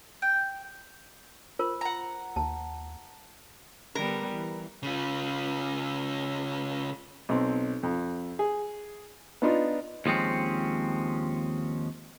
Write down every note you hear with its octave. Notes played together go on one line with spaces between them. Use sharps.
G5
F4 A#4 C5
F#5 A#5
D#2 A5
D3 G3 B3 A#4
E3
C#3 F4
B1 C4
F2
G#4
B3 D4 D#4 F4
D#2 F3 G#3 C4 C#4